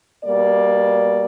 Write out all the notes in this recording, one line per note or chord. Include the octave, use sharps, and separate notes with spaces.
B2 G3 A#3 D5